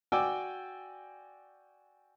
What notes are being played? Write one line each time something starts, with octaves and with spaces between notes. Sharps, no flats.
F#4 D5 G5 G#5 D6 E6